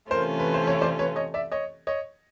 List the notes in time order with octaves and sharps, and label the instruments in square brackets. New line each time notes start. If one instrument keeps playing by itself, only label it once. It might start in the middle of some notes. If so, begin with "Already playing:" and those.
[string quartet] C3 E3 A3 C#4 F4 [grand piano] A#4 C5
[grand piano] B4
C5
C#5
C5 D5
B4 C#5
C#5 D#5
D5 E5
C#5 D#5
C#5 D#5